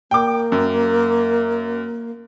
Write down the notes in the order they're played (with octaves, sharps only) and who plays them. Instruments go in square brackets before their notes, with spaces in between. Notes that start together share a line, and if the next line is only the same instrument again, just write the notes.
[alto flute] A#3 [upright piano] G5 D6
[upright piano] F#2